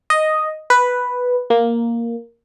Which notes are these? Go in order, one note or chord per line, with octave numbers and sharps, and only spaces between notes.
D#5
B4
A#3